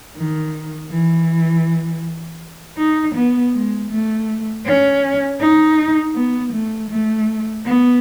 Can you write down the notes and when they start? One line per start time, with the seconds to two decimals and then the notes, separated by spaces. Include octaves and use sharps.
0.16 D#3
0.91 E3
2.78 D#4
3.15 B3
3.53 G#3
3.90 A3
4.65 C#4
5.40 D#4
6.15 B3
6.52 A3
6.90 A3
7.65 B3